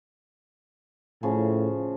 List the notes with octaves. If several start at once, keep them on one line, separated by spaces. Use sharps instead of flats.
A2 C#3 F3